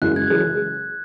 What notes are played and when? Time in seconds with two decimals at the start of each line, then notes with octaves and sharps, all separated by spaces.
0.02 F#2 C#3 E3 G#3 F#6
0.16 G#6
0.30 F#2 C#3 E3 G#3